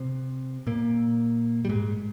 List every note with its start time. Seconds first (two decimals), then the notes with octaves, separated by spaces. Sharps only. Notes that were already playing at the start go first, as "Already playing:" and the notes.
Already playing: C3 C4
0.67 A#2 A#3
1.65 G3
1.69 G#2 G#3